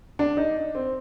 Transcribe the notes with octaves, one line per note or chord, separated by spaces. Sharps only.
D4
D#4
C4